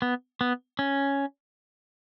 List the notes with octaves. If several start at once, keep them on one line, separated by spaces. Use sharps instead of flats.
B3
B3
C#4